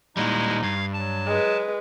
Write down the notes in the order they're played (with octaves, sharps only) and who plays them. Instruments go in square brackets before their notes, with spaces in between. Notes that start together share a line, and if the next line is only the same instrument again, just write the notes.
[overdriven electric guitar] A#2 G3 [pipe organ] G#3 E4 [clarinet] D#4
[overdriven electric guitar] G2 [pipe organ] F5 G#6
[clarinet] F#3 [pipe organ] A5
[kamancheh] G#3 B4